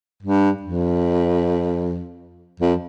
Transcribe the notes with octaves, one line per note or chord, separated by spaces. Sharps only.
G2
F2
F2